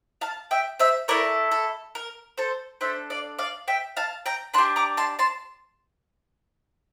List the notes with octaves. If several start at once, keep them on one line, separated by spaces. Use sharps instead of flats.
F5 A5
E5 G5
C5 E5
A3 E4 A4 A#4 D5
A4
A#4
A4 C5
D4 A4 C5 E5
D5 F5
D5 F5
E5 G5
F5 A5
G5 A#5
D4 G4 A5 C6
A#5 D6
A5 C6
A5 C6